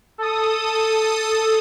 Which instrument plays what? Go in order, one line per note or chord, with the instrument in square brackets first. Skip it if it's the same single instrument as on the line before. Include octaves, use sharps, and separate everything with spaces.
[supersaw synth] A4 D#6